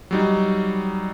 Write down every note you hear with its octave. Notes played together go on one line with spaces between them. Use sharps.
F#3 G3 D#4